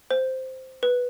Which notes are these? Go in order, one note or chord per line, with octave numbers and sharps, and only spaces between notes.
C5
B4